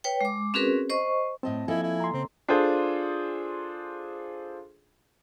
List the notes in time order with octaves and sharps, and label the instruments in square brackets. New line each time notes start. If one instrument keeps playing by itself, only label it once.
[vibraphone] B4 C#5 G5
G#3 D6
C4 C#4 F#4 G#4 A#4 B4
C5 D#5 C#6
[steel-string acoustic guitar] A2 D#5 A5 [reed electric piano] C4
[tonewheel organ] F3 G#5 [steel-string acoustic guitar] A#3 A4 D#5 [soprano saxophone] E4
[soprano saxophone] E4
[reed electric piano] A#5 C6
[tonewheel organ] C#3 [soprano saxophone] C4
[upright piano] D4 F4 G#4 A4 C5